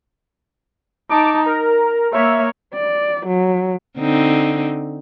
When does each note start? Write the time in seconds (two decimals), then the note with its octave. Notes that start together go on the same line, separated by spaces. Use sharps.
1.10 D#4 A5 D6
1.46 A#4 A#5
2.13 A#3 C#5 E5
2.74 D5
3.26 F#3
3.98 D3 C4 D#4